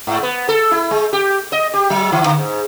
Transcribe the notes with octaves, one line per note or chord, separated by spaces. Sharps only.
G#2
B3
A4
E4
G#3
G4
D#5
G4
F#3
D#3
D3
G#2